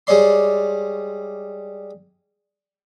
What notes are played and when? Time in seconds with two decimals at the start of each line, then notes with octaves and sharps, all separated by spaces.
0.07 G3 G#3 C#5 D5 C6